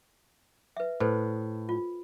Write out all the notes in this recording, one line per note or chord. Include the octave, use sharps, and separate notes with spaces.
B4 E5
A2 A4 B4 C5
F4